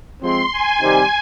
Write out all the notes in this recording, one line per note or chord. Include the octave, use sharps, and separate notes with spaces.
F3 G#3 C4 C6
G#5
C3 D#3 G3 C4 D#4 G#5